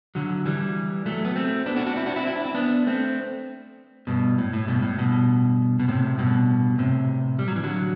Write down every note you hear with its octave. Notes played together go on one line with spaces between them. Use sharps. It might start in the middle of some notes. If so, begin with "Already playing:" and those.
D3 F#3
E3 G3
F#3 A3
B3
A3 C4
B3 D4
D4 F#4
D4 F#4
C4 E4
D4 F#4
C4 E4
E4
D4
C4
B3 D4
A3 C4
G2 B2
A2
A2
G2 B2
A2
G2 B2
B2
A2 C3
G2 B2
A2 C3
G3
F#3
E3
D3 F#3